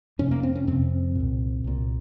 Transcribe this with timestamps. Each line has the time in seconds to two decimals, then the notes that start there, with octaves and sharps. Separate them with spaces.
0.19 F2 C3 C#4
0.31 A#3
0.43 C4
0.55 C#4
0.67 F2 C3 C4
1.15 C2 A#2
1.64 C2 A#2